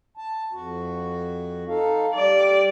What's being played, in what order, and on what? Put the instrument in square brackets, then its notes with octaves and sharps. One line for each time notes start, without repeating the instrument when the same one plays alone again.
[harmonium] A5
F2 F#4
D#4 A4 F5
[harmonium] G3 [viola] D5